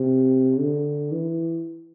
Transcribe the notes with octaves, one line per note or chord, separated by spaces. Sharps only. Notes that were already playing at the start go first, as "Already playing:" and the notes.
Already playing: C3
D3
E3